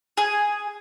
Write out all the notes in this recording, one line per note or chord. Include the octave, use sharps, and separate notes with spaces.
G#4